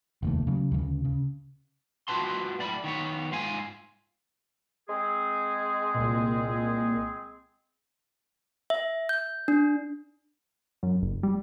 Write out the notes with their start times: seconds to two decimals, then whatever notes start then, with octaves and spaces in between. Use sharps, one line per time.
0.22 F1 D#2 A3
0.47 C#3 F#3
0.72 D2 C#3
1.05 C#3
2.08 F4 F#4 B4 A5 C6
2.59 A2 D5 B5
2.84 D#3 B3 C#5
3.31 G#2 F4 F5 G#5
4.89 G#3 C4 G#4
5.94 C2 A#2
8.70 E5
9.09 G6
9.48 D4
10.83 F#2
11.02 F#1
11.23 G3